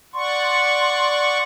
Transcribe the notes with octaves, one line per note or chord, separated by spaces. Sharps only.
D5 F#5 C6 C#6